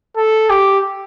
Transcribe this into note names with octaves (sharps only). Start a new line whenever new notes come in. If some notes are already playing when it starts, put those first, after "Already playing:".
A4
G4